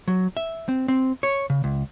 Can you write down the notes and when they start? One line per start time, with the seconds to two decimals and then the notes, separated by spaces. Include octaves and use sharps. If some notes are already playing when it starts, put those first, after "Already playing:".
0.08 F#3
0.37 E5
0.68 C4
0.88 C4
1.23 C#5
1.50 C#3
1.64 C#2